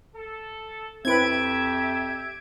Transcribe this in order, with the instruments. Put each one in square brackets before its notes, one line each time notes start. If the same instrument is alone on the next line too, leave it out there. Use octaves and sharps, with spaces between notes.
[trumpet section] A4
[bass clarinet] F2 [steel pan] C4 E4 B4 [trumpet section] G4 E5 [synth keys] G#6 D7